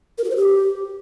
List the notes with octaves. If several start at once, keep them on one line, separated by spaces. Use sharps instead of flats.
A#4
F#4
C5
G4